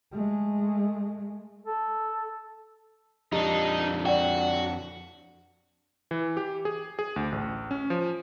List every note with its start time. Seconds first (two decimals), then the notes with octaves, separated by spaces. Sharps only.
0.12 G#3 A3
1.66 A4
3.33 F2 D4 D#4 G4
4.06 F#4 D5 G5
6.11 E3
6.37 G4
6.65 G#4
6.99 G#4
7.16 D2
7.32 A1
7.71 C#4
7.90 F3